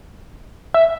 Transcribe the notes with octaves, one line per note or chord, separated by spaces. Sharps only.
E5